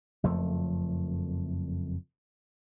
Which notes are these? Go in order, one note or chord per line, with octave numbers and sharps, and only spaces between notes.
F#1 F2 F3 A3